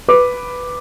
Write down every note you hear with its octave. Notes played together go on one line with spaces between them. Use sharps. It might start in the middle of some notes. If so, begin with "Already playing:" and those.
B4 D6